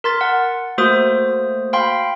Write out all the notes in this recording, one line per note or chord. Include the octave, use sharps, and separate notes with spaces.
A#4 C6 A6
F#5
A3 A#3 F#4 C5 D#6
F5 G5 B5 C6